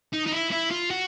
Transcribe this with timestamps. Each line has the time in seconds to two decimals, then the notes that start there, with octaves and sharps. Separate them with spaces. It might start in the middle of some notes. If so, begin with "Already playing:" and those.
0.13 D#4
0.26 D#4
0.32 E4
0.51 E4
0.71 F4
0.90 F#4